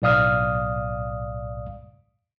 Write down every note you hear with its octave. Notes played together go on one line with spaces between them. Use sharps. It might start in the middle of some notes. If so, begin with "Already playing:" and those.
B1 A2 D5 F5 D#6 F6